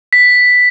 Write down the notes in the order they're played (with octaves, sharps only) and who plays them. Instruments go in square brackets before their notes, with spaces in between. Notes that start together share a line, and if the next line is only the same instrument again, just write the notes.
[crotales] B6